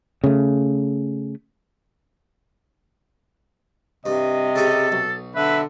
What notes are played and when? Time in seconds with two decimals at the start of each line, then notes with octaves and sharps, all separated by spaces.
0.24 C#3 A3
4.06 G2 C3 D#5
4.56 C#3 G4 A4
4.92 B1
5.36 D3 B4 E5